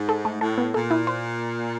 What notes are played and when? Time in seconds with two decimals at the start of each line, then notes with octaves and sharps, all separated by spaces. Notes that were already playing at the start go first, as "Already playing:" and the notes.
Already playing: G#2
0.09 A4
0.25 A3
0.41 A2 A4
0.58 B3
0.74 A#2 A4
0.90 E4
1.07 C5